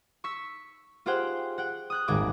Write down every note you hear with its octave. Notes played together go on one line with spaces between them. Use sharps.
C#6 E6 B6
F4 G4 G#4 C5 F#5 G5
F#5 G5
D#6 F#6 G6
D#1 G#1 G#4 G5 D6